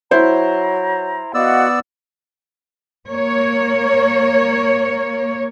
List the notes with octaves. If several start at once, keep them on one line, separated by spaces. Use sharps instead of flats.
F#3 E4 C5 A#5
B3 F#4 D5 D#5 F5 E6
A#3 C#5